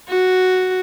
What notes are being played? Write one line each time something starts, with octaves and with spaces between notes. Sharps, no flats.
F#4